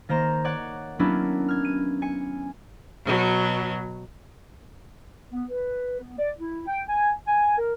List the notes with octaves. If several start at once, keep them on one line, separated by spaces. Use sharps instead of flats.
D#3 A#3 C5 A#5 E7
C#5 D5 F#5
F#3 A#3 B3 C#4 D4 E4
F6 G#6
D#7
G#5 C#7
B2 F#3
B3
B4
B3
D5
E4
G5
G#5
G#5
A#4